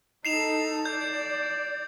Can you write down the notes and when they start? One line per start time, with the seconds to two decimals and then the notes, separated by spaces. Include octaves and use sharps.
0.25 D#4 A4 C7 E7 F7
0.85 D5 G6